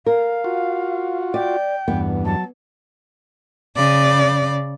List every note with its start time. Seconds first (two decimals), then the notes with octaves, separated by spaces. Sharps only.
0.06 A#4 F5
0.44 F4 F#4
1.34 D5 G5
1.88 E2 G2 B3
2.25 F#3 A5
3.76 C#3 D5